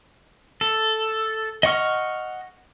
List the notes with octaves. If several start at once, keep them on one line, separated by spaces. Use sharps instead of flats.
A4
D#5 F#5 C#6 F6